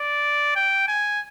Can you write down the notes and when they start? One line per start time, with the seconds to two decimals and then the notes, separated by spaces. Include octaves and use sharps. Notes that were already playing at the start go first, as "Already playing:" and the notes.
Already playing: D5
0.56 G5
0.88 G#5